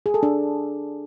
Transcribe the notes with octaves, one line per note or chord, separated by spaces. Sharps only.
G#4
A4
D4